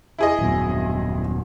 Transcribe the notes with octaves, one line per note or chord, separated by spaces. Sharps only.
E4 G#4 D#5
D#1 F#2 B2